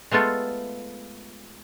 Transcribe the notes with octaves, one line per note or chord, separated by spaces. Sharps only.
G#3 A3 B3 F4 A4